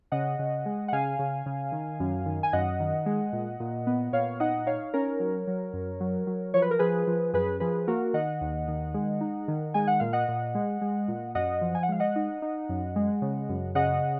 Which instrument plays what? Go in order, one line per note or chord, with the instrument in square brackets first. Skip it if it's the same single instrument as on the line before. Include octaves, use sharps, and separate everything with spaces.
[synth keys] C#3 D#5 F#5
C#3
G#3
F#5
C#3 F5 G#5
C#3
C#3
D#3
F#2
D#3
G#5
F#2 D#5 F#5
D#3
G#3
A#2
A#2
B3
A#2 C#5 F5
D#4 D#5 F#5
D#4 C#5 F5
C#4 A#4 C#5
F#3
F#3
F#2
F#3
F#3
F3 C#5
B4
A#4
F3 G#4 B4
F3
F#2 G#4 B4
F3 G#4 B4
A#3 F#4 A#4
D#3 D#5 F#5
D#2
D#3
G#3
D#4
D#3
G#3 G#5
F#5
A#2 F5
D#5 F#5
A#2
G#3
G#3
A#2
F#2 D#5 F#5
F3
G#5
F#5
G#3 F5
D#5 F#5
D#4
D#4
F#2
G#3
C#3
F#2
C#3 D#5 F#5